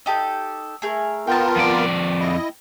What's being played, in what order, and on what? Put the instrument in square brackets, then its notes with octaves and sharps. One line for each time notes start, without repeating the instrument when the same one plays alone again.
[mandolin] D#4 G4 A4
A3 G#4 A#4
[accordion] B3 F4 A#4 [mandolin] G5 A5
[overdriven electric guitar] F2 D5
[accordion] E4 D#5